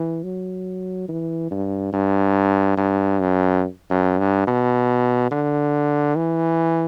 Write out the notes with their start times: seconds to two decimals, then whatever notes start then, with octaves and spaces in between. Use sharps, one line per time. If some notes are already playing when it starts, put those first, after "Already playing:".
Already playing: E3
0.24 F#3
1.09 E3
1.51 G2
1.93 G2
2.77 G2
3.20 F#2
3.90 F#2
4.19 G2
4.47 B2
5.31 D3
6.16 E3